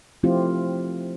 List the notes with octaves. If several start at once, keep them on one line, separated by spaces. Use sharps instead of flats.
F3 A3 C4 E4 F4 G4